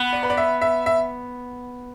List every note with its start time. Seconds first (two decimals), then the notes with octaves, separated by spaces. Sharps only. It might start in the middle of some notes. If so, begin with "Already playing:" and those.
Already playing: B3
0.13 D5
0.23 B4
0.30 D5
0.37 E5
0.62 E5
0.86 E5